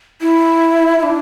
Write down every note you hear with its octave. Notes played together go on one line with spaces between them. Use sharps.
E4
E4
D4